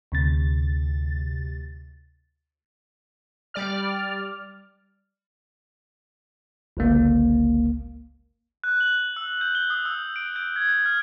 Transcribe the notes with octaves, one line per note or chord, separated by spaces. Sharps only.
D2 C3 A6
G3 D5 F6
G1 C#2 A#3
F#6
F#7
E6
G6
G7
D#6
E6
D7
G6
G#6
G6
F6